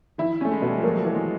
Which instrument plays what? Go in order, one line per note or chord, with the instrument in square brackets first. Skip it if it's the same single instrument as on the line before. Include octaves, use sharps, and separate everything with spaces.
[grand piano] D#3 [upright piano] E4
[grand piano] A3 [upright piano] C#4
[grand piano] G#3
[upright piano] B2 [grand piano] G3
[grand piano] F3
[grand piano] F#3 [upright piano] A#3
[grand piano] G3
[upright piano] E3
[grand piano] G#3